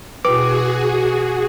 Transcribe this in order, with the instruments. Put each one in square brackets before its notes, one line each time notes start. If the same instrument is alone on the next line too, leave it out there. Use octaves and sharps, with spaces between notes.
[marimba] B2 E4 G5 [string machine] F#4 G#4 [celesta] B4 [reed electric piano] D6